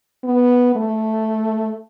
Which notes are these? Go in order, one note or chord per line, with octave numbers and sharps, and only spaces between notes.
B3
A3